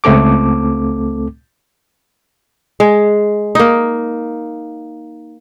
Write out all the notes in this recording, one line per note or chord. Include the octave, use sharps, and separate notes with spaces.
C#2 A3 C4 A4 D6
G#3
A#3 D#4